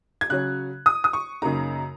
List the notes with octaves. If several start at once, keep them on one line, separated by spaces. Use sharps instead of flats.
G#6
C#3 F#3 C#4 F#6
D#6
D#6
C#6
F#2 C#3 A#3 D#4 A#5